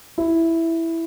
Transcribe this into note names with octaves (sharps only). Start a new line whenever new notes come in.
E4